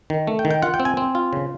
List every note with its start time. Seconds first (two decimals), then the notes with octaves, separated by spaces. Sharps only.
0.10 D#3
0.27 A3
0.39 G5
0.45 D#3
0.51 G5
0.62 F4 F#5
0.74 G5
0.80 C4
0.85 G#5
0.97 C4
1.15 F4
1.33 C#3